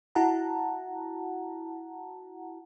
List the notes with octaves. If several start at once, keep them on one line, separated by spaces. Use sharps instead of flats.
E4 F#4 F#5 A5 A#5